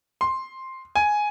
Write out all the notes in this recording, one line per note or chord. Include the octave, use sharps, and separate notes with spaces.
C6
G#5